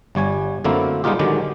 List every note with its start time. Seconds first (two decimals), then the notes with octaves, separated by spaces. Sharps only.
0.15 G1 G3 C#5 G#5
0.64 F#2 D3 A3 A#3 C4 E4
1.04 G3 G#3 B3 D#4 F4 G4
1.19 D3 D#3 F#3 G#3 G4